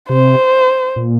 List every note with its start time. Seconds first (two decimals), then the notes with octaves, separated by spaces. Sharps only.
0.09 C3 C5
0.96 A#2